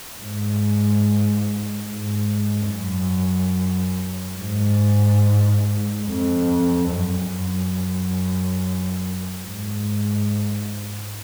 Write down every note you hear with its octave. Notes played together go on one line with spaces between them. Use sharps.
G#2
G#2
F#2
G#2
F2
F#2
F#2
G#2